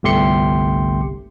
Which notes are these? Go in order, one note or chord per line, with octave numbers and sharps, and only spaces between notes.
G1 C2 A3 G4 C6 C#7